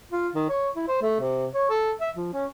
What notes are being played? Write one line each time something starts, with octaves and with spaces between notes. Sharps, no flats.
F4
D#3
C#5
E4
C5
A3
C3
C#5
A4
E5
F3
C#4